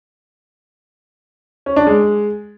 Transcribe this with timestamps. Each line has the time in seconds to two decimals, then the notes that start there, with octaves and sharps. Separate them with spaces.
1.66 C#4
1.76 D4
1.87 G#3